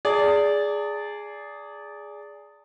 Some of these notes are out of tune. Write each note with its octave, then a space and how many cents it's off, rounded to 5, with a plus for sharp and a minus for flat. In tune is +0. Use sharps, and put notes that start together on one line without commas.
G#4 +0 D5 -15 A5 +45